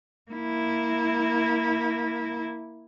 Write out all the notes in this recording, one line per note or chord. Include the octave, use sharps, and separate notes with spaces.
A#3 E4